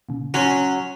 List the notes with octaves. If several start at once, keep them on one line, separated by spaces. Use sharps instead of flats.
A#2 C#3
F#3 C#4 C6